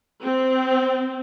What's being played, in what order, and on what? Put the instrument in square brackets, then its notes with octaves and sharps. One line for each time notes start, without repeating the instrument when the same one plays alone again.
[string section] C4